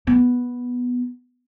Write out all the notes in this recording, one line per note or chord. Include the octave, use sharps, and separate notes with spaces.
B3